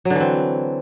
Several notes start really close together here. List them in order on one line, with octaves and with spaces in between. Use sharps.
F#3 D3 E3 C4